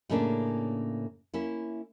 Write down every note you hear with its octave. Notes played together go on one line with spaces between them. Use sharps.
A2 C#3 A#3 C#4 D4
A#3 C#4 E4